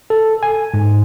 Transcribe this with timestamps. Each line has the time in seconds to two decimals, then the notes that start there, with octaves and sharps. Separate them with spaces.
0.10 A4
0.43 G#5
0.74 G#2